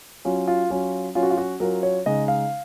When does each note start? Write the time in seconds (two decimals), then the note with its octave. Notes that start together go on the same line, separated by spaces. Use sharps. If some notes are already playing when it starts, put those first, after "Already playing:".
0.25 F#3 C#4 F4
0.48 F4
0.70 F#3 C#4 F4
1.15 F#3 C#4 F4
1.23 F#4
1.30 F4
1.38 F#4
1.60 F#3 C#4 F4 A#4
1.83 C#5
2.06 C#3 G#3 D#4 D#5
2.28 F5